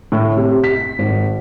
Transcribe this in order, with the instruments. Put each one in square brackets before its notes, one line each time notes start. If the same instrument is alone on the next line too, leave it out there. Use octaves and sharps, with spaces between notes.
[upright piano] A2
C3
B6
G#1